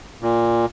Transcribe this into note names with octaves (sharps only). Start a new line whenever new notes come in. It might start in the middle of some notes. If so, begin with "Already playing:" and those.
A#2